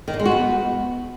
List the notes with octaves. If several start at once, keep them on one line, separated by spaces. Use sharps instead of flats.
D#3
A#3
G#3
F#4
B3